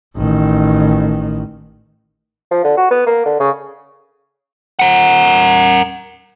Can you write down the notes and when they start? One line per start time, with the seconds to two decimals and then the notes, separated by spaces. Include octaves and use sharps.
0.17 A1 D#3
2.51 F3
2.64 D3
2.77 F#4
2.91 B3
3.06 A#3
3.26 D3
3.40 C#3
4.79 A#4 F#5